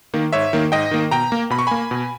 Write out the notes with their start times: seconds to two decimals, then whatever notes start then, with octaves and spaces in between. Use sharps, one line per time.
0.14 D#3 A#3
0.33 G#2 C#5 E5
0.53 D#3 A#3
0.72 G#2 D#5 G5
0.91 D#3 A#3
1.11 B2 G5 A#5
1.32 A#3
1.50 B2 B5
1.59 C#6
1.67 A#3 G#5 B5
1.91 B2